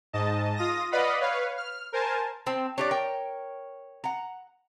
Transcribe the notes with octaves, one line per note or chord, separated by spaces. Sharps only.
G#2 D#5 A5
F4 D#6 A#6
B4 D5 D#5 F5 F#5 B5
B4 C#5 F5
F6
A#4 C5 G#5 A5
C4 A5
D4 G4 C#5 D5
A#4 G5
F#5 A#5